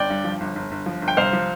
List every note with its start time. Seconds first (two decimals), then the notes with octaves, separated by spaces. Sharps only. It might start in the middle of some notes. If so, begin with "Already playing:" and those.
Already playing: G1 D5 G5
0.10 G2
0.24 F3
0.40 G1
0.55 G1
0.71 G1
0.86 F3
1.02 G1
1.08 G5
1.17 C2 C5 F5
1.33 F3